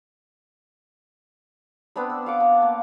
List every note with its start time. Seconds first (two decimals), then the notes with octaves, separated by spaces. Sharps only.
1.96 B3 C4 D4 B5
2.10 E6
2.26 F5 F#5 D6
2.40 A5
2.62 A#3